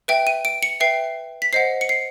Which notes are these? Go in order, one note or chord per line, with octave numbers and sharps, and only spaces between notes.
B4 E5 G5 D7
D#7
D7
C#7
B4 E5 G5 C7
B6
C5 D#5 F#5 C7
C#7
C7